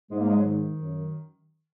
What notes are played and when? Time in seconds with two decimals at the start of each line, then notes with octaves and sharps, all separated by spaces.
0.11 G#2 G#3
0.19 A#3
0.28 G#3
0.37 F#3
0.45 D#3
0.79 F#2